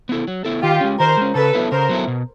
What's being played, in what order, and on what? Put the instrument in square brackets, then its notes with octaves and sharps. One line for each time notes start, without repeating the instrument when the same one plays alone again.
[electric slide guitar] B3 E4 A4
F#3
B3 E4 A4
[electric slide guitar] D#3 [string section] F4 G4
[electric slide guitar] G#3 C#4
[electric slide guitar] D#3 [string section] A#4 C5
[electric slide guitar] G#3 C#4
[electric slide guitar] C#3 [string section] A4 B4
[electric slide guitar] F#3 B3 E4 A4
[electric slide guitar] C#3 [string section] A#4 C5
[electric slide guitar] F#3 B3 E4 A4
B2